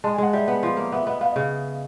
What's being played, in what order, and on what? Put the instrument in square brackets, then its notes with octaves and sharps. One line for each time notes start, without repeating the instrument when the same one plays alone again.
[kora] G#3 [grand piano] A5
[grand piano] G#5
[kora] G#3 [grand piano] F#5
[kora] G3 [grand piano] E5
[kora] B3
F3
A#3
[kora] B3 [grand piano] E5
[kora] B3 [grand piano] D#5
[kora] B3 [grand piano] F5
[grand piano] D#5
[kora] C#3